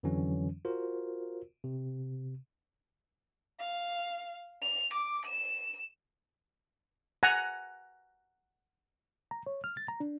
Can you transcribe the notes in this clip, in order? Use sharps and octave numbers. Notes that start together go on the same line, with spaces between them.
F2 D3 E3 F#3 C#4
F4 F#4 A#4 C5
C3
F5
F7
D6
E7
F#5 G#5 A#5
A#5
C#5
F6
A6
A#5
D4